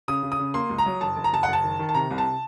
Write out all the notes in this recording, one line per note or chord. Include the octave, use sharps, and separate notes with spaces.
C#3 D#6
C#3
D#6
C#3
A#3 C6
C#2
A#5
F#3
F#1 A5
F#1
A#5
F#1 A5
F#5
F#1 A5
D#3
D#3
A5
C3 A#5
C2
A5